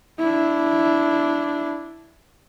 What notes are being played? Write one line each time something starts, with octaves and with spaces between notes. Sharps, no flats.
D4 E4